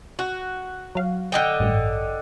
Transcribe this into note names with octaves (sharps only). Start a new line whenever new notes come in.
F#4
F#3 F5
D3 D#5 G5
A1 G2